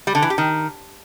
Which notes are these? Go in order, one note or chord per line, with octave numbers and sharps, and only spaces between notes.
G3
D3
E3
G4
D#3